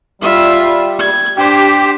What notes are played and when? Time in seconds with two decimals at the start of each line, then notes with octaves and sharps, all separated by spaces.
0.22 G3 F4 E5
0.99 G#6
1.37 D4 G4 C5